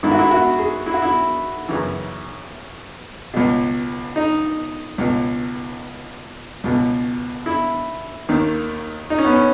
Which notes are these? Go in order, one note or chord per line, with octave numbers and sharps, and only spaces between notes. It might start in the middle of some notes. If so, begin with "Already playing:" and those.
G#2 D#3 E4
F#4
E4
F#4
G#4
E4
F#4
E4
F#2 C#3 E3
C#2 B2
D#4
C#2 B2
C#2 B2
E4
D#2 D#3
D#4
C#4
B3
C#4